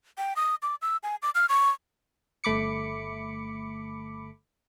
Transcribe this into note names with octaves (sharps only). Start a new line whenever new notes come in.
G5
D#6
D6
E6
G#5
D6
F6
C#6
G1 A3 B5 D6 C#7